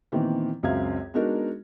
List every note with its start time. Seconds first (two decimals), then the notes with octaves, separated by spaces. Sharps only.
0.12 A#2 D#3 E3 B3 C4
0.63 C#2 F#2 C4 E5 F5 G#6
1.14 G#3 B3 D4 D#4 F#4 A#4